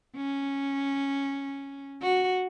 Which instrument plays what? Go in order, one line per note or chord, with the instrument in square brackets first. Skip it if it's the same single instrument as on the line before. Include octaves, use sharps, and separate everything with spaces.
[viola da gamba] C#4
F#4